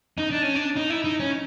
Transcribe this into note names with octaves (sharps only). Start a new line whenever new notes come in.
D#4
D4
C#4
D4
D#4
E4
D#4
C#4